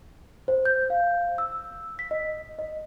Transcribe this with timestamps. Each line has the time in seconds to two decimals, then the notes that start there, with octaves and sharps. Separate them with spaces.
0.48 C5
0.65 G6
0.90 F5
1.38 E6
1.99 B6
2.11 D#5
2.59 D#5